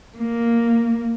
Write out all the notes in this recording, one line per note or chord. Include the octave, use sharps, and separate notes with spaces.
A#3